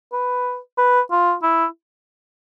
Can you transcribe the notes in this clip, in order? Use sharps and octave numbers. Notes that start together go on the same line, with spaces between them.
B4
B4
F4
E4